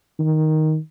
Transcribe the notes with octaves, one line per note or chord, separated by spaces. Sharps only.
D#3